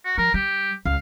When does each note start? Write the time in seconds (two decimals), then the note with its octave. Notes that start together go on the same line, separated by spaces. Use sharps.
0.05 F#4
0.18 F3 A#4
0.34 G3 G4
0.85 C#2 F5